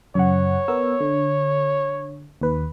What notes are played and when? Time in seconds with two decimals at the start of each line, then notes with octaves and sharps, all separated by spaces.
0.15 F#2 C#3 C#5 F#5
0.68 B3 A#4 E6
1.01 D3
2.41 D#2 B4